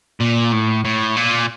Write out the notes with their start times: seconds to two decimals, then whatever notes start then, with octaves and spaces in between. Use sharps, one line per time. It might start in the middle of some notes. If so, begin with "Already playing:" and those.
0.21 A#2
0.53 A2
0.85 A2
1.17 A#2